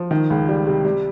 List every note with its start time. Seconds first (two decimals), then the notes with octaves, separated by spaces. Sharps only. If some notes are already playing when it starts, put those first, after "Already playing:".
Already playing: F3
0.11 D#3
0.30 C#2
0.49 G3
0.67 C3
0.85 G3